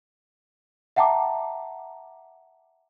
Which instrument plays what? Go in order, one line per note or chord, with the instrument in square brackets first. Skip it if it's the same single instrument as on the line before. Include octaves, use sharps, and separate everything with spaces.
[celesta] E5 F#5 G5 A5 A#5 D6